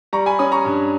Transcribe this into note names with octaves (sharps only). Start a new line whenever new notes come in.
G3 A#5 C#6
G#5 B5
C#4 B5 D#6
A#5 C#6
G2